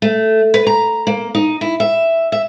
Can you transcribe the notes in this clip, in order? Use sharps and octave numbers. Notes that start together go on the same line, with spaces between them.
A3
B4
A#5
A#3
D#4
E4
E5
E5